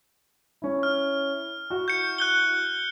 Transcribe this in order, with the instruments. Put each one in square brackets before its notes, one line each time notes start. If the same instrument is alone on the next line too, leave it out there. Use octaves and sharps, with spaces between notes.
[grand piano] C#4 E4
[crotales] F6
[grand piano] E4 F#4
[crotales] G6 C#7
F#6 G6 G7